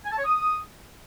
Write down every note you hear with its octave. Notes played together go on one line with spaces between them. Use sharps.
G#5
A5
C#5
D#6